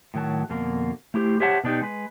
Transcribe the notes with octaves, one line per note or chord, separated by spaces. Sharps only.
A2 D#3 F#3 A5
F2 B2 D3 A#3
A3 E4 G4 C5
G4 C5 C#5 E5 F#5 A5
B2 D4 D#4 G4
G#3 B4